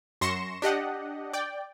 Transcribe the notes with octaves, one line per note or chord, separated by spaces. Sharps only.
F#2 C6 C#6 A#6 C#7 E7
D4 G4 D#5 F#5
D5 G5